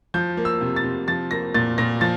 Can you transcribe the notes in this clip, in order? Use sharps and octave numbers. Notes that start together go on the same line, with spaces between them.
F3 G6
A#3
E6
C3
A6
C3
F3 A6
A#3 A#6
A#2 A6
A#2 A#6
F3 A6